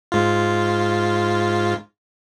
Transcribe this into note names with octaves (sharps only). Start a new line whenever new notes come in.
G#2 F4